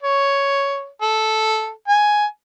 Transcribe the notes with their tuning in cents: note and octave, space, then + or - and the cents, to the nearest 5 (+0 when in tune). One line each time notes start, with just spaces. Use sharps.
C#5 +5
A4 -5
G#5 +5